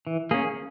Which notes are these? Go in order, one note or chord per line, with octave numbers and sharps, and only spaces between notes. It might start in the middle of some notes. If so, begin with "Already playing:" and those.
E3
A#3 C#4 G#4